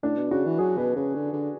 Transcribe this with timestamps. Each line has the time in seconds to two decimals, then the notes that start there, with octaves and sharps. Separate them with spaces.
0.03 A2 D4
0.17 B2
0.31 C#3 F#4
0.46 E3
0.58 F#3 G#4
0.77 B2 B4
0.96 C#3 B4
1.15 D3
1.33 D3